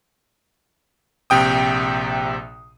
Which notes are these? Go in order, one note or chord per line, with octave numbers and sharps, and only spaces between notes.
A#1 C3 G5 D#6